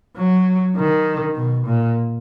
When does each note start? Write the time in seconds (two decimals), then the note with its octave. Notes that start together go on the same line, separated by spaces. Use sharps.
0.17 F#3
0.76 D#3
1.36 B2
1.66 A#2